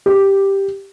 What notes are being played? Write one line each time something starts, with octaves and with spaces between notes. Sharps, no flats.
G4